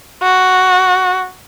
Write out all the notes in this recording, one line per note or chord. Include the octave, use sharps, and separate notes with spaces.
F#4